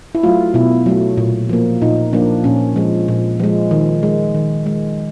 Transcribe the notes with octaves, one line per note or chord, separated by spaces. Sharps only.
E4
F#3 A3 F4
B2 E4
F#3 A3
A#2
F3 A#3
A#2 D#4
F3 A#3 D4
A#2 C#4
F3 G#3
A#2
F3 G#3
D#3
G#3
D#3
G#3